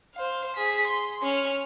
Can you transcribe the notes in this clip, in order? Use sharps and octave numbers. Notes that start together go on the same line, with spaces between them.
C5 F5
G#4 B6
C6
C#4 F6